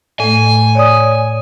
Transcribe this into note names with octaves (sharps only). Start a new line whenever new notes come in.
A2 A3 G#5
C#5 D5 D#6